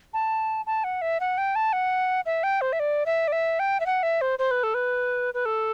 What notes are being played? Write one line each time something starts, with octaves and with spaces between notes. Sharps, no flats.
A5
A5
F#5
E5
F#5
G5
A5
F#5
E5
G5
C5
E5
D5
E5
D5
E5
G5
E5
F#5
E5
C5
C5
B4
A4
B4
B4
A4